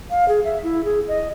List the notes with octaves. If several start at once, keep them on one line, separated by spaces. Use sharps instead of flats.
F5
G#4
E5
E4
G#4
D#5